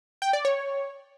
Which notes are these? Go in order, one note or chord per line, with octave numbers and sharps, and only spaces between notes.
G5
D5
C#5